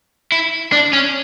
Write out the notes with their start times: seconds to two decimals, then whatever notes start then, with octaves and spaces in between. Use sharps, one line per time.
0.32 E4
0.72 D4
0.93 C#4